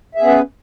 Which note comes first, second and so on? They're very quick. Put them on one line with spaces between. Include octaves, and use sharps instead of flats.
E5 G#4 B3 C#4 B4